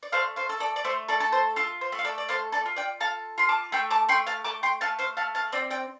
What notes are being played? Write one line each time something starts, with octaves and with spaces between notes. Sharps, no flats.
D5
A3 C5 F5
C5 F5
A4
A4 D5
D5
A3 C5
A4 D5
A4
C5
F4 A4
C5
A3
F5
A4 D5
D5
A4 C5 F5
A4 D5
F4
D5 G5
A4 F5 A5
F4 C6
A5 D6
A3 G5 C6
A5 D6
A3 G5 C6
F5 A5
A3 A5 D6
G5 C6
A3 F5 A5
C5 F5
A3 F5 A5
F5 A5
C4 D5 G5
D5 G5